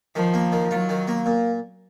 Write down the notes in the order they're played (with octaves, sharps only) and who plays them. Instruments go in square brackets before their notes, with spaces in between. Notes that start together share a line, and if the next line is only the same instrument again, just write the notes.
[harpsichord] D#3 [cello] F3
[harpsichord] A#3
D#3
[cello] F#3 [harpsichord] F4
[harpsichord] D#3
A#3
A#2